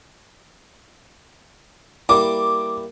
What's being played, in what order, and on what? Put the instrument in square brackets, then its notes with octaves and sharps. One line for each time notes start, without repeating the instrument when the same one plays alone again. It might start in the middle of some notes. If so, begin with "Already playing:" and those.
[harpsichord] G3 A#3 E4 [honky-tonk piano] D6